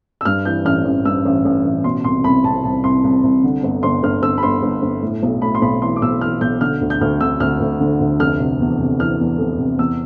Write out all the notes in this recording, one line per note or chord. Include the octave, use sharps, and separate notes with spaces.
E6
G2 F6
E3 G6
A1 F6
A1
G2 E6
A1
A1
A1
B2 C6
C2 C6
C2 B5
C2 A5
C2 A5
C2 C6
C2
C2
D3
G1
G1 C6
G1 F6
G1 E6
B5
G1 C6
G1
G1
A2
B1
A2 B5
C6
B1 B5
E3 C6
D6
B1 E6
E3 F6
B1 G6
D3 F6
D2
G6
D2 F6
D3 E6
D2 F6
D2
D3
D2
F1 F6
C3
E2
C3
E3 F6
E2
F1
C3
E2 E6